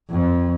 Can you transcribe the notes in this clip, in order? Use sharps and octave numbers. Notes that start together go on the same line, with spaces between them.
F2